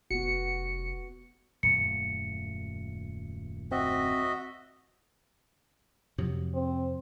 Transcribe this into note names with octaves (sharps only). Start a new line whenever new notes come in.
F1 B3 F#4 C#7
D#1 F#2 A3 C#7
C4 F#4 D#5 E5
F2 C3 F#3
C4